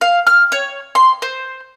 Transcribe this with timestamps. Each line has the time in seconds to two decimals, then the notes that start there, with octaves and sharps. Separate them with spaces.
0.01 F5
0.27 F6
0.52 C#5
0.95 C6
1.22 C5